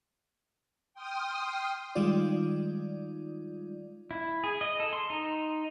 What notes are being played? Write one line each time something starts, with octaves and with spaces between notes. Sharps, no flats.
G5 C6 D#6 F6
D#3 G3 G#3 D#4 F4 D5
E4
G#4
D#5
A4
C6
D#4